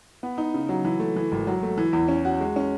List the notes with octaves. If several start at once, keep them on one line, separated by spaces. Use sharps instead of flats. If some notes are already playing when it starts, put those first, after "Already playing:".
B3
D#4
C#3
F#3
E3
A3
E3
G#1
F#3
A3
E3
E2
C#4
F#4
G#3
C#4